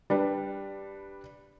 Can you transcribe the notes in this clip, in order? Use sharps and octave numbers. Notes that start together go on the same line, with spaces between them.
G3 D4 B4